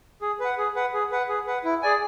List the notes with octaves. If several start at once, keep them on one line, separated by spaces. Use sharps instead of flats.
G#4
B4 F#5
G#4
B4 F#5
G#4
B4 F#5
G#4
B4 F#5
E4
G#4 D5 G#5